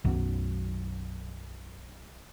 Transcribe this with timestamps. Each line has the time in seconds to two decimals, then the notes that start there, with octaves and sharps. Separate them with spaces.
0.05 B1 F#2